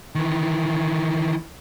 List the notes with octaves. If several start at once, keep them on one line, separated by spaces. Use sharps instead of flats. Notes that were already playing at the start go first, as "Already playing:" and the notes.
D#3 E3